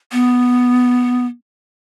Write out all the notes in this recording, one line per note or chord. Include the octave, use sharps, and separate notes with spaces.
B3